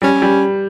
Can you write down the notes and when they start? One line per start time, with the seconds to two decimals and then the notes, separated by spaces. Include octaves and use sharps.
0.02 G3 C#4
0.22 G3